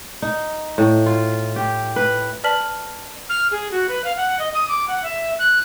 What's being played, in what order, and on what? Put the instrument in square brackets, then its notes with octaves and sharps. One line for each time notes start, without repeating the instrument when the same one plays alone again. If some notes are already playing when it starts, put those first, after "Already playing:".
[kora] D#4
A2
F4
G4
B4
[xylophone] B4 D5 A5 F6 B6 F#7
[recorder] F6
G#4
F#4
B4
F5
F#5
D#5
D#6
D6
F#5
E5
F#6